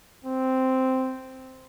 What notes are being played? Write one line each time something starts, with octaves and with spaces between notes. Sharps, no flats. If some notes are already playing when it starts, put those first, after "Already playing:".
C4